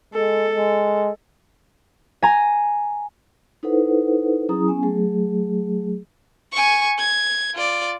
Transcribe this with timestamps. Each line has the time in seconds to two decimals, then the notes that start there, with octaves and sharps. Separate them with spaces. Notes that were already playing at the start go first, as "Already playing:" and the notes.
0.14 G#3 A4
0.53 G#3
2.22 G#5 A#5
3.63 D#4 E4 A4 B4 C5 F#5
4.49 F#3 C#4 E4 G#4 A#5 D#6
4.68 B3 C#4 G#5
4.83 F#3 A3 G#4
6.52 G#5 C#6
6.98 G#6
7.54 F4 D5